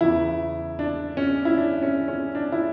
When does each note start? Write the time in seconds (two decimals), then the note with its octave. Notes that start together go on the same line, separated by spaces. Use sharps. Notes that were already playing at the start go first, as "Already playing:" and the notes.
0.01 E2 C#3 E3 E4
0.79 D4
1.17 C#4
1.45 E4
1.57 D4
1.83 C#4
2.08 C#4
2.35 D4
2.52 E4